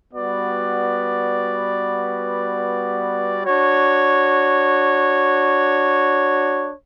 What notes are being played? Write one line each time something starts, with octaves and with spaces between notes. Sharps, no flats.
G3 B3 F#4 B4 D5
D4 F#4 C#5